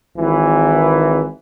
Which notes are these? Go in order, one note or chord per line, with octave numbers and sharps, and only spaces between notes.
G#1 E3